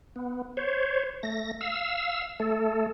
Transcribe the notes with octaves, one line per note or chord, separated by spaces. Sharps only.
B3
C5 C#5
A3 A#6
F5 E6
A3 A4